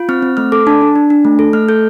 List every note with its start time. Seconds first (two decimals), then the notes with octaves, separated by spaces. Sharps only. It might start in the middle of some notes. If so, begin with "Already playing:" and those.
Already playing: F4
0.09 C4 F6
0.22 C4
0.37 A3 F6
0.52 A4 D6
0.67 D4 A5
0.82 D4
0.96 D4
1.10 D4
1.25 A3
1.39 A4
1.53 A3 F6
1.69 A4 G6